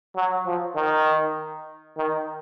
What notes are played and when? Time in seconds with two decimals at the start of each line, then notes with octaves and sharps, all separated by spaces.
0.16 F#3
0.46 F3
0.76 D#3
1.97 D#3